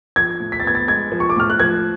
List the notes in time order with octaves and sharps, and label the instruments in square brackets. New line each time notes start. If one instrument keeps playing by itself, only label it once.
[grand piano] F3 [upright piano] G#6
[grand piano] A2
[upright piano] B6
A6
[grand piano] B3 [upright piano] G#6
[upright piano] A6
[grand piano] G#3 [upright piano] G#6
[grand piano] F3
[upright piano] C#6
D6
[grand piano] A2 [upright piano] F6
[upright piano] F#6
[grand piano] F3 [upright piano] G#6